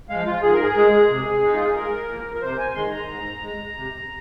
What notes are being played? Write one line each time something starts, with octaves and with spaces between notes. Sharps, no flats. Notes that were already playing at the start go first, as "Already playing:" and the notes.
F3 G#3 F5
F4
G#2 G#4
A#4
G#4
G#3
C3
G#3 D#4
F4
G#4
G#2 A#4
F3 A#3
A#4
C3 C5
G#5
D#3 G#3 C6
A#5
G#2 A#5
G#3
C3